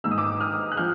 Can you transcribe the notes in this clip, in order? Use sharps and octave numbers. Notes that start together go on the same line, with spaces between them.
G#2 D#3 G#3 E6
D#6
D6 E6
D#6 F6
F#6
F3 F6 G6